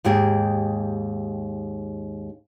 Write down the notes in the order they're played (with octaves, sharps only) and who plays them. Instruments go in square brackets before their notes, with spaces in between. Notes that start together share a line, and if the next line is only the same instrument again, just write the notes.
[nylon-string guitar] D#2 G#2 G4 G#4